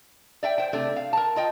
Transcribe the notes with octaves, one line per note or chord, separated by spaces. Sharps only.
D5 E5 G5
C5 G5
C3 A3 D4
F5
A#4 A5
F4 D#5 G5